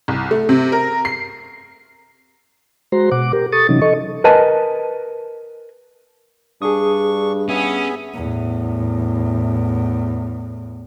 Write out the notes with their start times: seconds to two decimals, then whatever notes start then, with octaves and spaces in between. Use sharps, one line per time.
0.08 C2
0.31 A3
0.49 C3
0.72 A#4
1.05 C7
2.92 G#3 F#4 C5 A#5 C6
3.12 B2 F#5 D6
3.33 G4 A#4
3.52 A4 C#6 D#6 A6
3.69 C3 E3 F#3 C#4 D#4
3.82 A4 D#5 C#6
4.24 A#4 B4 D#5 G#5 A5
6.62 G2 D4 G#4 C#6 D#6
7.49 B3 C#4 G#4 E5
8.14 E2 A2